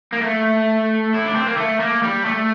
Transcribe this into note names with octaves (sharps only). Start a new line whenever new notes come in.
A#3
A3
E4
D4
C4
A#3
A3
A#3
G3
A3